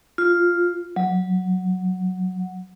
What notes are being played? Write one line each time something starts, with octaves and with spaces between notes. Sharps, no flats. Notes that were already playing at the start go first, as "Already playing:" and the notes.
F4
F#3